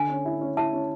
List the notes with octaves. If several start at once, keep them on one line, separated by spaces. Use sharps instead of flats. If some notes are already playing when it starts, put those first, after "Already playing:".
Already playing: D3 G#5
C#4
E4
C#4
E4 A5
C#4